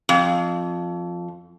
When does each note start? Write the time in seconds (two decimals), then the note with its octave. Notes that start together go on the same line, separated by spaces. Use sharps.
0.09 F2